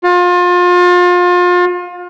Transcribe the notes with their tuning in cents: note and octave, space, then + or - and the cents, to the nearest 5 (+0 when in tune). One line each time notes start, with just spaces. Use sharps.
F4 +30